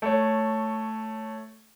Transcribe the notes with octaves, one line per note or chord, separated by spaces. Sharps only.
A3 C#5